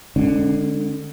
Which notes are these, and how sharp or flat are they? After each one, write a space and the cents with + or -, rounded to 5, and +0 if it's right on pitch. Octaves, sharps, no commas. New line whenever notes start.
D3 +25 G#3 +0 C#4 -10